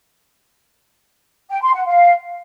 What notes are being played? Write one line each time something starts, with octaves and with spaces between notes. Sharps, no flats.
G5
C6
F#5
F5